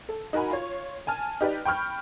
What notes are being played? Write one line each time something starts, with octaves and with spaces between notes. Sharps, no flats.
A4
D#4 F#4 A#4 G#5 B5
F4 C#5
G#5 A5 F6
D#4 G4 B4 D5
G5 B5 C#6 F6 G6